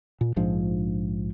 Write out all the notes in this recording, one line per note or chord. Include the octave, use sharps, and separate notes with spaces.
A#2
A#1 G#2 F3 D4